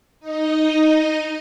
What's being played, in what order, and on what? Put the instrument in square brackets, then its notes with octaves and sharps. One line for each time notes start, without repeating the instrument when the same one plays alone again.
[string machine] D#4 D#5